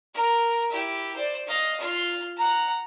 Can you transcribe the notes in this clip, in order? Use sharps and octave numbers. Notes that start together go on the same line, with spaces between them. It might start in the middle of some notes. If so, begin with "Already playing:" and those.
A#4
E4 G4
C5 D5
D#5 F5
F4 C6
F#5 A#5